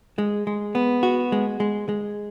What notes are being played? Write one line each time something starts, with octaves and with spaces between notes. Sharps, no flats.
G#3
G#3
B3
F#4
G#3
G#3
G#3